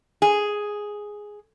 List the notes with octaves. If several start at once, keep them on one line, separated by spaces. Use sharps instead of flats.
G#4